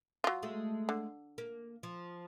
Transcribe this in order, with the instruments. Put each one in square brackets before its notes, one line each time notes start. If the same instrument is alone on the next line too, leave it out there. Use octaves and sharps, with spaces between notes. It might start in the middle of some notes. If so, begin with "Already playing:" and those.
[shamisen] F#3 F4
[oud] G#3 A3
[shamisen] D3
[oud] A#3
F3